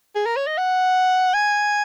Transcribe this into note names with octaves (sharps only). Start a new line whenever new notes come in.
G#4
A#4
C#5
D#5
F#5
G#5